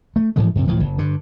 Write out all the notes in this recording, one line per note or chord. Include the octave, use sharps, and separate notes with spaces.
A3
G#2 E3 F3 G#3
F#2 C3
D1 A2 E3 F3
F#1
G2 D3